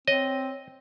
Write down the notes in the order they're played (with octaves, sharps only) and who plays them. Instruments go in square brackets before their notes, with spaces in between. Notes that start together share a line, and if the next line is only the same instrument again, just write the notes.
[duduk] C4 [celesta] C#5 [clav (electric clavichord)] D#5